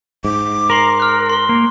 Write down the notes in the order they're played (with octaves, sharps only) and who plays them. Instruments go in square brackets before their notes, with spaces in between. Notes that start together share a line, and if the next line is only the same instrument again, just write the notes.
[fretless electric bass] G#2 [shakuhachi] D6
[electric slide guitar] A#4 [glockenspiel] A#5 C6 C7
[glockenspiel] F6 F#6
C6 G7
[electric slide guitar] A#3